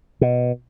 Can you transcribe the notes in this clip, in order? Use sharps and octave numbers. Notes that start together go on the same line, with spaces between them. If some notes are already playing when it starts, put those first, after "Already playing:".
B2